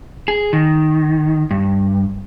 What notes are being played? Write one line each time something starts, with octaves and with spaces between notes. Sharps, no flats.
G#4
D#3
G2